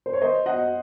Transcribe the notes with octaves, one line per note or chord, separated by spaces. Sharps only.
C5
C#5
C5 D#5
D#5 F#5